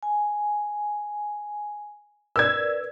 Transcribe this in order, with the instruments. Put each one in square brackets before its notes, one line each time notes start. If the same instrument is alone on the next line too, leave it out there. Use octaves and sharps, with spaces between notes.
[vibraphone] G#5
[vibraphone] A#4 B4 D5 [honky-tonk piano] E6 G#6